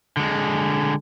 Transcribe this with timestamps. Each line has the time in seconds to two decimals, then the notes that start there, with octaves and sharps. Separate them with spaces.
0.17 D3 G#3